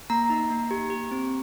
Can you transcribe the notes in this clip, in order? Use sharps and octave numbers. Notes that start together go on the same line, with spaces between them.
A#3 A#5
D#4
A#3
G4
G4
C4